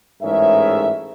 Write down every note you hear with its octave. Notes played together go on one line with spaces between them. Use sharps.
A1 G#2 G#4 A#4 C#5 E5